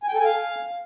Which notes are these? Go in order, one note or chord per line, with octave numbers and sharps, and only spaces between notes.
G#5
G5
A4
G#5
F5